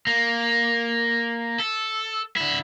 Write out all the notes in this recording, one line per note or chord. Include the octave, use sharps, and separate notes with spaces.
A#3
A4
D3 E4